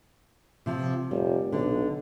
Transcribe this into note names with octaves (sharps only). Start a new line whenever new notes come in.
C3 F3
F1 G3
B1 D3